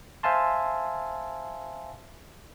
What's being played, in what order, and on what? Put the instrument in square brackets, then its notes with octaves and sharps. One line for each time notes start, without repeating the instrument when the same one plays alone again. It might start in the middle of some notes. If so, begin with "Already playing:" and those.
[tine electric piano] C5 E5 F5 G#5 A5 C6